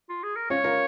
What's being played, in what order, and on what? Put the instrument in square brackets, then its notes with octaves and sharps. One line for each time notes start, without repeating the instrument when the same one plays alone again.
[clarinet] F4
G#4
A#4
[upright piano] C#4 F4 [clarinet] C#5
[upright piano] F4 A#4